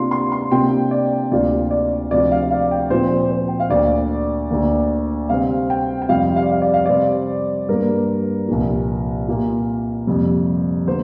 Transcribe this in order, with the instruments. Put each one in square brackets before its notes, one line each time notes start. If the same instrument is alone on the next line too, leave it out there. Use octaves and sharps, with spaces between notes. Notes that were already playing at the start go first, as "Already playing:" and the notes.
Already playing: [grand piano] C3 A#3 D4 F4 C6
C6
C6
C3 A#3 D4 F4 G5
D5
D2 C3 A#3 D4 F4 D5
D5
D2 C3 F3 D4 F4 D5
F5
F5
G5
A#2 F3 C4 F4 C5
C5
G5
F5
D2 D3 A#3 D5
D2 D3 A#3
C3 G3 C4 F5
G5
G5
F2 C3 G3 C4 F4 F5
F5
D5
F5
D5
F5
C3 G3 C4 D5
G2 G3 A#3 A#4
C2 A#2 F3
A#2 A#3 F4
F2 C3 G3 A#3
D3 A#3 C5